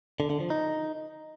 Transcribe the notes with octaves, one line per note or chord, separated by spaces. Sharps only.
D3
D3
F3
D#4